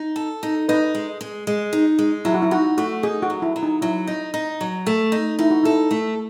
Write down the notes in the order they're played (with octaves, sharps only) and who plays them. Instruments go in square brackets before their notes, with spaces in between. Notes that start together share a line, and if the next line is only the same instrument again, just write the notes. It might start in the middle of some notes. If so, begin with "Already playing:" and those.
Already playing: [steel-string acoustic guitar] D#4
A4
D#4
[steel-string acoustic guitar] D#4 [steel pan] B4 D#5
[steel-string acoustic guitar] G#3
G#3
G#3
D#4
G#3
[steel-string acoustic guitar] F#3 [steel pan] E4
[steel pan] F#4
E4
[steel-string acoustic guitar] D#4 [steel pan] F#4
[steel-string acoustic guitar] A3 [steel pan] F#4
[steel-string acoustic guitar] D#4 [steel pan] G#4
[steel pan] F#4
[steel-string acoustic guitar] F#3
[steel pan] E4
[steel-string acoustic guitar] F#3
[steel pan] D#4
[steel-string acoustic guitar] F#3 [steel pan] E4
[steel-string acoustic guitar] D#4
D#4
F#3
A3
D#4
[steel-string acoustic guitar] D#4 [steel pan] E4
[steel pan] F#4
[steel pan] E4 [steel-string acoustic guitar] A4
[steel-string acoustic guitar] A3